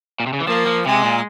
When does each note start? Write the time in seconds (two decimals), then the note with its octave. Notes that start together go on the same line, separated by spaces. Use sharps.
0.20 A#2
0.27 C3
0.33 C#3
0.40 E3
0.47 F3 A#3
0.66 F3
0.86 C3 G#3
1.04 A#2